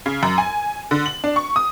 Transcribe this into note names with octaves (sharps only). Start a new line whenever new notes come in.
C#3
F#2
G#5
D3
F#7
D4
C#6
D#6